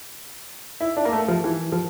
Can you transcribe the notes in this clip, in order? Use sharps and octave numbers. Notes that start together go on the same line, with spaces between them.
E4
D4
A#3
A3
F3
E3
F3